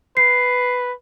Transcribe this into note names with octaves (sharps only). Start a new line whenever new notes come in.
B4 C7